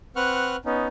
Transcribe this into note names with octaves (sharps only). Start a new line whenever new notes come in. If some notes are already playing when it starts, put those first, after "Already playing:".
C4 B4 F#5 C#6 F6 F#6
B3 C#4 D#4